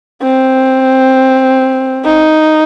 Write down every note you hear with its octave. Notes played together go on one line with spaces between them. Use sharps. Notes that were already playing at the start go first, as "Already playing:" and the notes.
C4
D#4